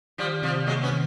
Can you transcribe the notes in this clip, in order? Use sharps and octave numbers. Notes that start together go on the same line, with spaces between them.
D#3 F3 G3
C3 F3 G3
F#3 G#3 A#3
B3 C#4
D#3